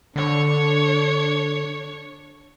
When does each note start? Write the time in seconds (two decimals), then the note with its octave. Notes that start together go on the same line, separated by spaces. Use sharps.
0.16 D3 D4 C#5